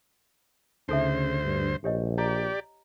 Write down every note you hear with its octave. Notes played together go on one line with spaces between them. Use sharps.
D2 C#3 D#4 A4 C5 E5
G2
A#1 G4 C#5 D#5
G4 D5 A#5